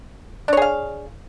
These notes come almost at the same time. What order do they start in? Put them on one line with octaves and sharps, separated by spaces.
D4 C#5 G#4 F5